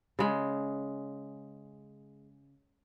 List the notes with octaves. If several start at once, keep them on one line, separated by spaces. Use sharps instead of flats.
C#3 G#3